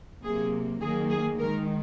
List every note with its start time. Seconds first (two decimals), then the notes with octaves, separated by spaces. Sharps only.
0.22 C3 F#3 A#3 G#4
0.80 D#3 F#3 A#3 G#4
1.10 G#4
1.39 D#3 G#3 A#4